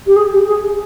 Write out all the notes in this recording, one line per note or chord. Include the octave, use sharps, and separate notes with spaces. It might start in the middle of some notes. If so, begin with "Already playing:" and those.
G4
G#4
G4
G#4